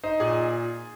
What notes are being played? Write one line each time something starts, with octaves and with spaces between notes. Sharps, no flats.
D#4 C5
A#2 G#4